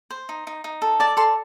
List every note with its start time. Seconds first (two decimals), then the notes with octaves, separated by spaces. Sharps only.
0.10 C5
0.29 D#4
0.47 D#4
0.64 D#4
0.82 A4
1.00 D5 A5
1.17 A4 C6